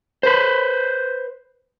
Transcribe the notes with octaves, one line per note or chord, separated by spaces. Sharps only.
B4 C5